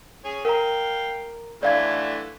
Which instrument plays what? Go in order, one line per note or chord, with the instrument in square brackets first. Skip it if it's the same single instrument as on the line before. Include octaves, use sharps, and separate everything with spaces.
[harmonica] G#4 C#5
[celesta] A#4 A#5 [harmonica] F5 G5
[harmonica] D3 E3 A3 [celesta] D5 F5 G#6